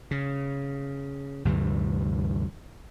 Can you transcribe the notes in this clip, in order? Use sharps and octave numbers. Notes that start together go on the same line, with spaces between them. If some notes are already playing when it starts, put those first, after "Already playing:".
C#3
D2 G2 C3 E3